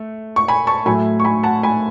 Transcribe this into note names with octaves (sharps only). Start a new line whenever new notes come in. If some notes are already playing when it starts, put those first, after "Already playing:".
Already playing: A3
C#6
G#5 B5
A5 C#6
A2 F#3 A3 G#5 B5
C#6
G#5 B5
F#5 A5
G#5 B5